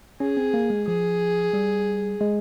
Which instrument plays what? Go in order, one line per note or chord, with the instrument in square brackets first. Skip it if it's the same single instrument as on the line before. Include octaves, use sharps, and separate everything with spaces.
[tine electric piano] C#4 [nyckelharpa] G#4
[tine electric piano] C4
A#3
G#3
[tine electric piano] F3 [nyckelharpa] G#4
[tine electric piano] G3
G#3